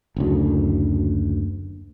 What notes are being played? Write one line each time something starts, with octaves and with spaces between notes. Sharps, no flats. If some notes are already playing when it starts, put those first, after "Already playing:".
F#1 D2